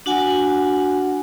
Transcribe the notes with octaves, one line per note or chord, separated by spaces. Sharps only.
D4 F#4 F#5 G#5